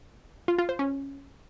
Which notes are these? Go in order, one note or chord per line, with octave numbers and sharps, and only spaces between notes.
F4
F4
C5
C#4